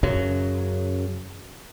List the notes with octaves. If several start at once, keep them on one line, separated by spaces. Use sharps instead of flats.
F#2 C#3 F#3